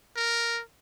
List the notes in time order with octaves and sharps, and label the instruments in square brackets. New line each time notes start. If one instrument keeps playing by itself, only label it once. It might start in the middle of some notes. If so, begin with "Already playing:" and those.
[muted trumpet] A#4